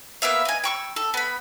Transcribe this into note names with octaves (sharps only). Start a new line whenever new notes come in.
A#3 B3 E5 F5
D#5 G#5
G5 C#6 E6
A4
B3 B5